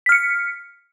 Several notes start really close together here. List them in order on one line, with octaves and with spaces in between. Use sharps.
B6 F6 C#7